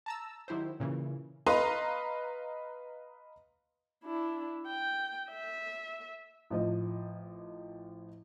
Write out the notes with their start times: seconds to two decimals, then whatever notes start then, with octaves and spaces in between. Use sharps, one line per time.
0.06 A5 A#5 E6
0.48 D#3 F#3 E4 G4 C5
0.80 A#2 C#3 E3
1.46 B4 D#5 F5 A#5 C6
4.04 D4 E4
4.67 G5
5.30 E5
6.50 A1 F3 D#5